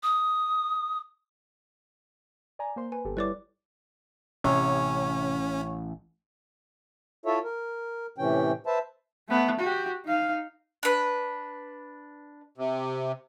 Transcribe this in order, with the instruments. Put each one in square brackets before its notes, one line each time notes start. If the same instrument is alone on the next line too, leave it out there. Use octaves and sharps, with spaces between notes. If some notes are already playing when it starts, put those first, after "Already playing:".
[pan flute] D#6
[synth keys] D5 G#5 A#5
A#3 C5 C6
[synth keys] B4 [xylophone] G#5
[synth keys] G1 G4 A4
[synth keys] G3 E4 C#5 [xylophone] B4 D5 D6
[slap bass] A1 [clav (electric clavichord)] C3 [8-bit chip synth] C#4 [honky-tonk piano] C#5
[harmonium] E4 F4 A4 C#5 E5
A#4
A2 C3 E3 C#4 G5
B4 C5 E5 A5
[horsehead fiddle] A3 B3
F#4 G4
D#4 F5
[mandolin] D4 B4
[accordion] C3